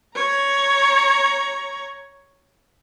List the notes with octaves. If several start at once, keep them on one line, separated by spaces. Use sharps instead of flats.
C#5 A#5